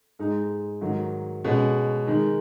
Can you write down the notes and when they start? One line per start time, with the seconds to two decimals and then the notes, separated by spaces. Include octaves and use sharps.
0.19 G#2 G#3 D#4
0.81 G#2 D#3 F#3
1.45 B2 G#3 C#4
2.07 D#3 G#3 D#4